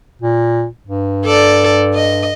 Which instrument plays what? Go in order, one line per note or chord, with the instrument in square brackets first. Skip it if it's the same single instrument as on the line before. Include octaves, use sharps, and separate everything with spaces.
[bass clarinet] A#2
G2
[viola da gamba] A4 D5
D#5